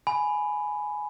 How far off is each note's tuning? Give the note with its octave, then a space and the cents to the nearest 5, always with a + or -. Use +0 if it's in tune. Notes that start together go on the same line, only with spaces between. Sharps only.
G#5 +10 B5 +5